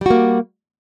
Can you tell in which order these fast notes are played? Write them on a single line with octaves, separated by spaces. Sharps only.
G3 F#4 A#3